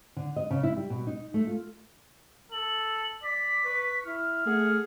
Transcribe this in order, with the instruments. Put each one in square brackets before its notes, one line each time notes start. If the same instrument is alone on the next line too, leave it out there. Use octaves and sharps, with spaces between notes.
[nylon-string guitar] D3
D#5
C#3
E4
G3
B2
D#4
A3
F4
[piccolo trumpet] A4 [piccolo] F#7
[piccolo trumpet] D5 [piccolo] B6
[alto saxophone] B4 [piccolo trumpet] C#6
[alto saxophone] E4 [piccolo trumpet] F6
[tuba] A3 [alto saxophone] G#4 [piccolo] F#5